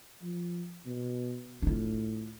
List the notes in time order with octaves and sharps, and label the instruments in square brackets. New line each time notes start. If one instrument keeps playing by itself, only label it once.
[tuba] F3
B2
[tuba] A2 [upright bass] D4 F4